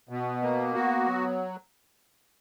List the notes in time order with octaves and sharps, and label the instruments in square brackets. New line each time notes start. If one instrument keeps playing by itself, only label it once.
[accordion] B2 [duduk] B3
[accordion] A#3
[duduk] B3 [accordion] F#4
[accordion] F#3